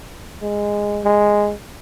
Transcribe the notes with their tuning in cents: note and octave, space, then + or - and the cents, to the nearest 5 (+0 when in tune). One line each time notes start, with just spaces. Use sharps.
G#3 -10
G#3 -5